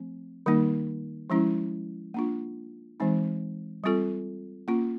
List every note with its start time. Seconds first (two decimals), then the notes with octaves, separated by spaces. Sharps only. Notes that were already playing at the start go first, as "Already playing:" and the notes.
Already playing: F3 A3 C4
0.46 D#3 G3 A#3 D#4
1.30 F3 G#3 C#4 E4
2.14 A#3 D4 F4
3.00 E3 G#3 C4 D#4
3.84 G3 C4 F4 A4
4.68 A#3 C#4 F4